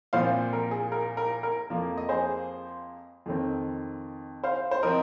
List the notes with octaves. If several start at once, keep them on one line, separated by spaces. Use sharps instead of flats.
A#2 F3 C4 C5 F5
A#4
G#4
A#4
A#4
A#4
F2 F3 A#3
D#5
G#4 C5
F2 D#3 C4
C5 F5
C5
F3 C4 A#4 D#5